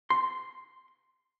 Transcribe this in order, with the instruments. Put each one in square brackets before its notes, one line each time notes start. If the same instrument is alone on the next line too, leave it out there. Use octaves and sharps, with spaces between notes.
[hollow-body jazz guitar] C6